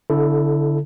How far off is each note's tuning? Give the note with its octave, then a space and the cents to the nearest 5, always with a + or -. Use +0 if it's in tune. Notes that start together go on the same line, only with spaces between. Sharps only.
D3 -30 E4 +0 A4 +0